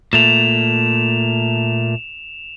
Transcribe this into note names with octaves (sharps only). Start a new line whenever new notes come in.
A#2 A3 E7 F7